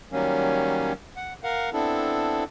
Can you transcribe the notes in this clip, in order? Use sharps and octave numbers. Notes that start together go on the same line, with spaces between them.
D#3 F#3 G3 A#3 C#4
F#5
A#4 F5 F#5
B3 C4 D4 E4 A4